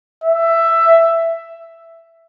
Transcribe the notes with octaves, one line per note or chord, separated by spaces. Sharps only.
E5